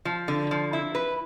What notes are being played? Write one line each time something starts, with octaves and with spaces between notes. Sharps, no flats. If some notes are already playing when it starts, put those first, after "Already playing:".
F3
D3
F3
E4
B4